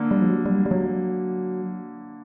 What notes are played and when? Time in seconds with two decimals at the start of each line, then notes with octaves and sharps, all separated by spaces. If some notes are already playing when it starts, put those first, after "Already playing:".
Already playing: D3 A#3
0.11 G3
0.22 F3
0.28 F#3
0.46 G3
0.66 G3
0.71 F#3